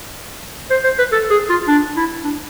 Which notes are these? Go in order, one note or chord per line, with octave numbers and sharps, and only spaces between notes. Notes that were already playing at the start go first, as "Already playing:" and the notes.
C5
C5
B4
A4
G#4
F4
D4
E4
D4